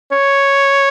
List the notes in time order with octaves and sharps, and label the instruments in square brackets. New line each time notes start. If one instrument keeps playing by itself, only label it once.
[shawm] C#5